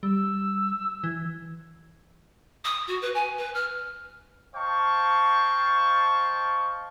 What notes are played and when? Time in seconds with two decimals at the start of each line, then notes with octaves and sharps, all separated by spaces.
0.03 G3 E6
1.04 E3 G#6
2.65 D#6
2.87 F#4
3.01 B4
3.14 G#5
3.38 B4
3.54 F6
4.55 C5 D#5 F5 G5 A5 C#6